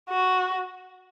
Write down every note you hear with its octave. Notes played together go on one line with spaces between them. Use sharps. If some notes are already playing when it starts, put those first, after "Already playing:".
F#4